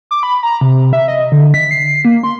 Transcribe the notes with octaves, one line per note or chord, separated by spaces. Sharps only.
D6
B5
A#5
C3
E5
D#5
D3
B6
C7
A#3
C6